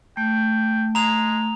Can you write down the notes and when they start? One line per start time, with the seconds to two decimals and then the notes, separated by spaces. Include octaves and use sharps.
0.17 A3 G5
0.95 G#3 A#5 F7